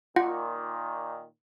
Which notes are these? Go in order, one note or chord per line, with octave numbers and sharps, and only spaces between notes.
A#2 D#3 F4 F#5